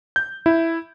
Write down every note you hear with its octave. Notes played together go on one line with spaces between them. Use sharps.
G6
E4